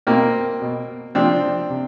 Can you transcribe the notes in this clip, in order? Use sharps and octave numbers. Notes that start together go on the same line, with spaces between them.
B2 A#3 C4
B2
C3 F3 C4 D4
C3